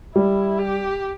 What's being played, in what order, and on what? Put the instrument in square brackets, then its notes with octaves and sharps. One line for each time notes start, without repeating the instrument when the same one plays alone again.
[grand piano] G3 [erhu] E4
[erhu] G4